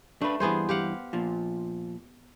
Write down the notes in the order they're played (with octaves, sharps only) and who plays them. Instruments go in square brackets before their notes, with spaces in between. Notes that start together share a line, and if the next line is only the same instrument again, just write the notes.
[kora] A3 [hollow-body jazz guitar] D4 B4
[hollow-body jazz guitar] G2 E3 [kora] B3 G#4 C5
[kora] G4 F5 F#5
[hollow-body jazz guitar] A#2 F3